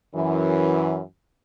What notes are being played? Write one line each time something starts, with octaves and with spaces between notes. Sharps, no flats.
F#2 E3